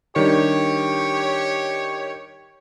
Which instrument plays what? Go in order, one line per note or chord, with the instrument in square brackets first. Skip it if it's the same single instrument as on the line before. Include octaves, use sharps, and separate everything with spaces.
[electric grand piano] D#3 G3 D4 [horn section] G4 C#5